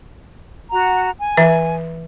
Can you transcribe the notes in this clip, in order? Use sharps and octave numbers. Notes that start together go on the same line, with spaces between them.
F#4 F#5 A#5
G#5
E3 E5